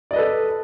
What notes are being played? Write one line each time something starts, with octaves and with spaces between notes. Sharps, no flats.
A4 B4 D5 D#5